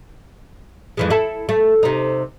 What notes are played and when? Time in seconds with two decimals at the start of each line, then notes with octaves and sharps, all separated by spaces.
0.97 F2 E3 G#3
1.10 E4 A4
1.49 A3
1.83 C3 D#4